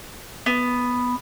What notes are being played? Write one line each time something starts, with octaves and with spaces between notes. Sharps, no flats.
B3